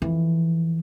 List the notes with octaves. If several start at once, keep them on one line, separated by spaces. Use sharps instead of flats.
F2 E3